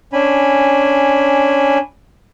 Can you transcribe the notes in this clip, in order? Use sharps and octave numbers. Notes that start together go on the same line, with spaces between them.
C#4 D4 G#5 B5